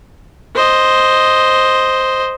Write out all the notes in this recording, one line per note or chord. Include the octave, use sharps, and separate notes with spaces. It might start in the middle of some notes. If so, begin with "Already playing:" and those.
C5 D#5